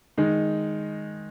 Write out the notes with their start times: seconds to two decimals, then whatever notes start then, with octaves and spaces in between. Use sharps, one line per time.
0.17 D#3 G#3 D#4